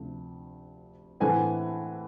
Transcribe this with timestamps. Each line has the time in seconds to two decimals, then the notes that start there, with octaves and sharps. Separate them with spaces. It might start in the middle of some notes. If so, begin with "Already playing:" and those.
Already playing: D2 C3 F3
1.20 A2 E3 A3 C4 F#5 G#5